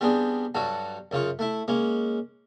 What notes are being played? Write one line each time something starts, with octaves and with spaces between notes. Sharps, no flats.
G3 B3 C4 D4 G#4
G2 F#3 F#4 A4
F#2 C#3 F4 C#6
A3 E4
G#3 A#3 C#4